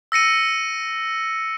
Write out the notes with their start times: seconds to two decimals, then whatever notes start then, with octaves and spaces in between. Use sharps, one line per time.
0.12 E6 A#6 C#7 D#7